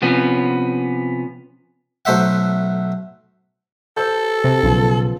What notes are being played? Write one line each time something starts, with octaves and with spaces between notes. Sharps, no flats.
C3 F3 B3 C#4
B1 A3 C5 E5 F#5
A4 C5 E6 G6
C3
B1 C#3 F3 B3